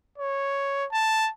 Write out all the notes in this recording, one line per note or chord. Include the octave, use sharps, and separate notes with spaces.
C#5
A5